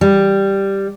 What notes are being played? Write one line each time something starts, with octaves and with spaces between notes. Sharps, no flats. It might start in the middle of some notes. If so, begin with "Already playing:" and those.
G3